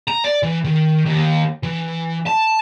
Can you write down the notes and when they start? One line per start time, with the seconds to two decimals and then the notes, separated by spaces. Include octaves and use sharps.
0.08 A#5
0.25 D5
0.43 E3
0.64 D#3
1.05 D#2
1.63 E3
2.26 A5